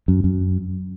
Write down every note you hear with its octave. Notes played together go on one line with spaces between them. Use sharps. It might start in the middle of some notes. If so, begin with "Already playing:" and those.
F#2
F#2